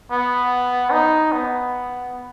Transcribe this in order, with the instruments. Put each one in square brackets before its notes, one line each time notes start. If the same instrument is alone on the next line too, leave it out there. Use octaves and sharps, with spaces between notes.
[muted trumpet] B3
D#4
B3